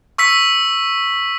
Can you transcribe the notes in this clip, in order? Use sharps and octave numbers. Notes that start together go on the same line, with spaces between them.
C#6 E6 B6